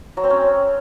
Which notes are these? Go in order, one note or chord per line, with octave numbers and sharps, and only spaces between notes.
F#3
C4
C#4